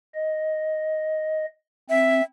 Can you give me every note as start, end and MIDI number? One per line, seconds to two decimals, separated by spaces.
0.15 1.46 75
1.89 2.21 60
1.89 2.23 76